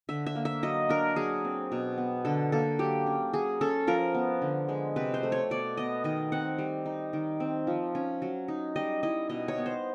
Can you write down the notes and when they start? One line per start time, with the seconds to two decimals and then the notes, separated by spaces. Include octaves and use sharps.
0.09 D3 E5
0.26 E5
0.35 A#3
0.45 E5
0.63 F#3 D#5
0.89 D4 A#4
1.16 F#3 G#4
1.45 C4
1.72 B2
1.98 B3
2.25 D3 A4
2.52 A#3 A4
2.79 F#3 G4
3.06 C#4
3.33 F#3 G#4
3.61 C#4 A4
3.87 F3 A#4
4.14 B3
4.42 D3
4.69 G#3
4.96 C3 B4
5.14 C5
5.23 A3
5.32 C#5
5.50 B2 D5
5.77 B3 D#5
6.04 D#3 D#5
6.32 C4 F#5
6.58 G3
6.86 D#4
7.13 D#3
7.40 C4
7.67 F3
7.95 C#4
8.22 F#3
8.48 D#4
8.76 G3 D#5
9.03 E4 D#5
9.29 B2 D#5
9.48 C#5
9.58 B3
9.66 C5